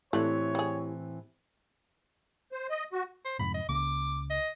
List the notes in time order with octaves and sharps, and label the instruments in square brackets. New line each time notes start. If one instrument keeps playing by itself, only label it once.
[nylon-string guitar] A2 E3 C4 [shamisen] A3 D4 [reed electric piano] E4 G4 [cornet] C#5
[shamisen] G3 G#4
[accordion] C5
D#5
F#4
[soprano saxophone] C5
[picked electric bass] F2 G#2 C3 [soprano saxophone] B5
[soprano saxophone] D#5
[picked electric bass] C#2 C#3 A#3 [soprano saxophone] D6
[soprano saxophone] D#5